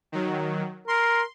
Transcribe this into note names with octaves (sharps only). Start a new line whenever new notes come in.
D#3 F#3
A#4 C6